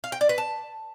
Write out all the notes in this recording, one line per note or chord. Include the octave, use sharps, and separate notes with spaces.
F5
G5
D5
B4
A5